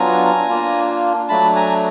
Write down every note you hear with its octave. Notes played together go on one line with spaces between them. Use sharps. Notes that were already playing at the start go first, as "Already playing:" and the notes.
Already playing: F#3 B3 D4 F4 G#5 A#5
A#3 D4 F4
F#3 A3 D4 A5 B5
G#5 A#5